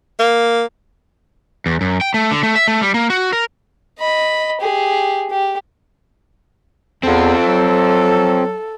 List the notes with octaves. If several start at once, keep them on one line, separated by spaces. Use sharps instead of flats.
A#3
E2
F#2
G5
A3
D3
A3
E5
A3
G3
A#3
F#4
A#4
D#5 B5
G4 G#4
G4
E2 C4 F4 A4
F#3